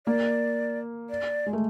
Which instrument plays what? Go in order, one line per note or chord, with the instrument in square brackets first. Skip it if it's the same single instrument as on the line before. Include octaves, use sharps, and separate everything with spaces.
[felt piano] A#3 [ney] D5
[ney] D5
[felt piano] G#3
A3